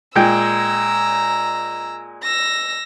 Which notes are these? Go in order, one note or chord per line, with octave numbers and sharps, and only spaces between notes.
A#2 G#3 G5 A#5 E6
E6 A#6